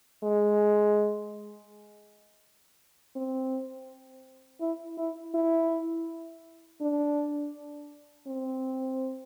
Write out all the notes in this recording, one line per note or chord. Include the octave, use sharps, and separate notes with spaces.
G#3
C4
E4
E4
E4
D4
C4